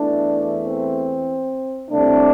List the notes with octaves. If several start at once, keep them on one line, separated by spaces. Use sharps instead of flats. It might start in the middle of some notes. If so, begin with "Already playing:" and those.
Already playing: E2 E3 A3 D4
C4
C2 C3 A3 C4 D4